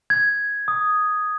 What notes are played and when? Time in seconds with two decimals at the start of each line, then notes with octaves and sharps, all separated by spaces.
0.10 G#6
0.68 D#6